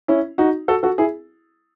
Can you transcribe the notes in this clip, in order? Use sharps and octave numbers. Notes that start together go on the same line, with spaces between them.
C#4 E4
D#4 F#4
F#4 A4
F#4 A4
E4 G#4